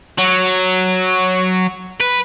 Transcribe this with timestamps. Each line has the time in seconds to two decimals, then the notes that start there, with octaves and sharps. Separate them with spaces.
0.18 F#3
2.01 B4